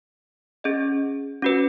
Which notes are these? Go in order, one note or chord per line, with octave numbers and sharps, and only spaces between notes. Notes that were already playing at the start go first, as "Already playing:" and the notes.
C#4 G#4 D#5
C#4 F#4 B4